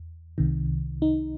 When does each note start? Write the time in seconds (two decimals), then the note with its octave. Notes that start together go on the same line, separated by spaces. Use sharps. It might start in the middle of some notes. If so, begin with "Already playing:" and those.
Already playing: E2
0.38 C2 C3 D#3
1.02 D#4